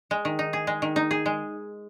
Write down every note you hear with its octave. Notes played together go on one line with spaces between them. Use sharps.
G#3
D#3
D#4
G#4
G#3
D#3
D#4
G#4
G#3